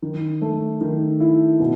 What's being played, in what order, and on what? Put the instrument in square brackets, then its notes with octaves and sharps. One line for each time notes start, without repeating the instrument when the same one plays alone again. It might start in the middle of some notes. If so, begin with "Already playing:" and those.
[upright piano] D#3
A3
D#3
E4
B2